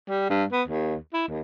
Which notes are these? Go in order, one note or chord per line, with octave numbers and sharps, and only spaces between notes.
G3
G2
B3
D#2
E4
D#2